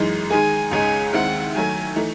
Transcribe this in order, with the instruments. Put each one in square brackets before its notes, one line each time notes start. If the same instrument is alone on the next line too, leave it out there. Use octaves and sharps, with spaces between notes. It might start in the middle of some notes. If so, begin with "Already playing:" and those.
Already playing: [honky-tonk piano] F#2 E3 G#3 D#4
[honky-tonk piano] D#3 G#3 D#4 G#4 [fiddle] G#5
[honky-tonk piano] C#2 C#3 G#3 D#4 [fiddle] G#5
[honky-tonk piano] D#2 D#3 G#3 C4 E4 [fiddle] F#5
[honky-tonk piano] D#3 F#3 A3 [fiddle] G#5
[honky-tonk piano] E3 A3 D#4